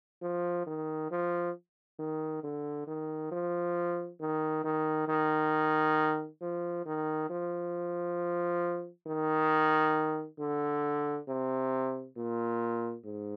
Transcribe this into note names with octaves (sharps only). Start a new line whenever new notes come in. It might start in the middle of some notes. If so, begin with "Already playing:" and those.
F3
D#3
F3
D#3
D3
D#3
F3
D#3
D#3
D#3
F3
D#3
F3
D#3
D3
C3
A#2
G#2